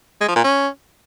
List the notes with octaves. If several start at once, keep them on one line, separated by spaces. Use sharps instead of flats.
G#3
F3
A#2
C#4